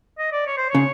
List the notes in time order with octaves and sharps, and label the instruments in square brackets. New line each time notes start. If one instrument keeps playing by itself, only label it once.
[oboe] D#5
D5
C#5
C5
[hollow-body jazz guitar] C#3 [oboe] C#5